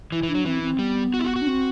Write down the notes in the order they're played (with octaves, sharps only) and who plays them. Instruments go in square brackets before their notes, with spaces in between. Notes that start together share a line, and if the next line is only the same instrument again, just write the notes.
[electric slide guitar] E3 [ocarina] E4
[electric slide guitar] E3
[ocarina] D4
[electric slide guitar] F#3
[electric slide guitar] E3 [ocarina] C4
[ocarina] C4
[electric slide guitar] G3 [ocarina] B3
[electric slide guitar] F#4
E4
F#4
F#4
[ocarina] D4
C4